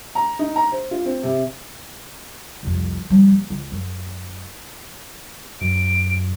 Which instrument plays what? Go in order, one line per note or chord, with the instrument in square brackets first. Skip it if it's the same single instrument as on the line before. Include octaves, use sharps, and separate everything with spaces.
[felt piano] A#5
D#4
A#5
C5
F4
C4
C3
[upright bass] C2 F2
F3 G3
D#2
C#2
F#2
[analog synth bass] F#2 [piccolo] D7